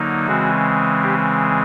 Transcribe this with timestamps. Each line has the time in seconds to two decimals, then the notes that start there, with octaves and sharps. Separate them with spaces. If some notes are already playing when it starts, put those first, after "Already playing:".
Already playing: D3 F#3 A#3 D#4
0.27 C#3 E3 G#3 C4 F#4
1.03 G4